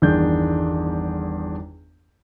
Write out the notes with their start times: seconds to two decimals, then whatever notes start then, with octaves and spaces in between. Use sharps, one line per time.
0.02 G1 E2 D#3 D4 G#4 G6